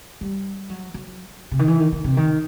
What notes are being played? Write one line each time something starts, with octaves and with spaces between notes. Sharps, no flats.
G3
F#3
F#3
C3
D#3
E3
D#3
D#3
C3
D#3